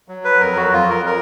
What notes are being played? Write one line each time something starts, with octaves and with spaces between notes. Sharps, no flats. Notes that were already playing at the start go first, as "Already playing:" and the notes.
F#3
B4
F2 A#4
F#4
F2 F4
A#4
A#4